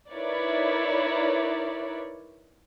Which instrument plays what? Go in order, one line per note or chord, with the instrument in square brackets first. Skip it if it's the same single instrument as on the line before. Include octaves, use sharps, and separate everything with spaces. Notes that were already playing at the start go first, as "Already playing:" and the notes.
[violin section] D#4 E4 A#4 B4 C#5 D5